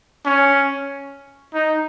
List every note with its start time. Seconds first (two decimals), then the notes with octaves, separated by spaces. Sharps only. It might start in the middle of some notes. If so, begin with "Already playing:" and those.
0.25 C#4
1.54 D#4